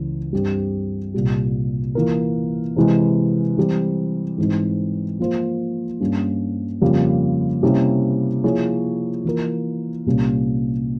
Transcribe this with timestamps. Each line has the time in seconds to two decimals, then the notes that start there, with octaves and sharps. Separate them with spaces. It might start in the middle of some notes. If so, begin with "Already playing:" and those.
Already playing: C#2 C#3 E3
0.33 G2 G3 C4 G4
1.14 C2 A#2 G3
1.95 E3 A#3 F4 A#4
2.76 C3 E3 G#3
3.57 E3 G3 C4
4.38 G#2 E3 G#3 C4
5.19 F3 A#3 F4 C5
6.00 G2 G3 A#3 C#4
6.81 F2 C#3 G3 A#3 F4
7.63 C3 G3 A#3 C#4 E4
8.44 F3 A#3 E4 G#4 C#5
9.25 E3 A#3 F4 A#4
10.06 C2 A#2 G3 A#3 C#4